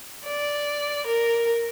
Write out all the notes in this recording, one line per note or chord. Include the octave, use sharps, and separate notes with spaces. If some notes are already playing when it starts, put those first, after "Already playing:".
D5
A#4